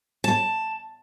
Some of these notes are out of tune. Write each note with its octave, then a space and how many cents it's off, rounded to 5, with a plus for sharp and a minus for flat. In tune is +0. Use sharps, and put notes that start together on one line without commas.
A5 +5